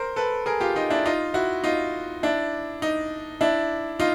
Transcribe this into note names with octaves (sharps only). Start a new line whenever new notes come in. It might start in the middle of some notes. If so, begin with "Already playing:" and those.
Already playing: A#4 C5
A4 B4
G#4 A#4
F4 G4
D#4 F4
D4 E4
D#4 F4
E4 F#4
D#4 F4
D4 E4
D#4
D4 E4
D#4 F4